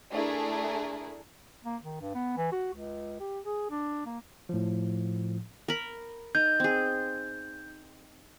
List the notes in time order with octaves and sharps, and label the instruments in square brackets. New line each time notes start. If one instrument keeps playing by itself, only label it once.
[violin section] A3 D4 E4 G#4 A#4
[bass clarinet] A#3
D#3
G2
B3
E3
F#4
C#2
G4
G#4
D4
A#3
[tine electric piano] A2 F3
[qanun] A#4 B5
[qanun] D#4 [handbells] G6
[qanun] C4 G#4